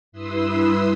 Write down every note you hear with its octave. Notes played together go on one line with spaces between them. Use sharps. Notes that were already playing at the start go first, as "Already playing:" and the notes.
G2 E4 B4 C6 D#6 E6